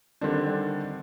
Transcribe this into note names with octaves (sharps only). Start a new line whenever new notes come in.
D3 D#3 G3 C4 D4